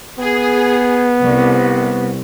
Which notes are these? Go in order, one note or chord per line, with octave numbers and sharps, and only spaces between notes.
B3 G#4
C2